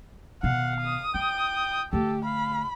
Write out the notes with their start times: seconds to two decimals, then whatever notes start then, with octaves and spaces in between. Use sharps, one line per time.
0.43 B2 D#3 F5 F#5
0.82 D#6
1.14 E4 G5
1.93 D3 A3 G4 A4
2.25 F5 B5